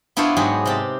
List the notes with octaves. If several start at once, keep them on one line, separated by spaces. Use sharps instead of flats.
B3 D4 E4 F4 C5 C#5
G#2 F#3 G4 G#4 D#5
C3 G4 A5